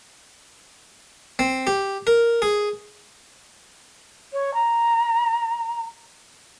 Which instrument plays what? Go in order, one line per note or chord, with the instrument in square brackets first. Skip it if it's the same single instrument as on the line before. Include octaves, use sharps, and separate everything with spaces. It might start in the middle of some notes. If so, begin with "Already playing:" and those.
[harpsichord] C4
G4
A#4
G#4
[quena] C#5
A#5